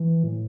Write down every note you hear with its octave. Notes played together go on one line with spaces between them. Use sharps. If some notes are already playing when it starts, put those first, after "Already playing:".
Already playing: E3
A2